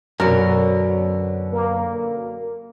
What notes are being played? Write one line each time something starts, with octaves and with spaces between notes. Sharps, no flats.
F#2 B2 D3 C#4 A#4
A#3